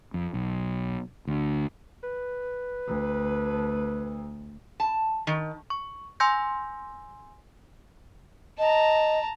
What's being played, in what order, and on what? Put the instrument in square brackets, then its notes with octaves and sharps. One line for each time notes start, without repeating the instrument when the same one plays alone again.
[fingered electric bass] F2
B1
D2
[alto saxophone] B4
[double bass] D2
[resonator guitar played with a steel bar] A5
D#3
[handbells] C#6
G#5 C6 E6 G6 A#6
[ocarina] D#5 [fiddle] A5 A#5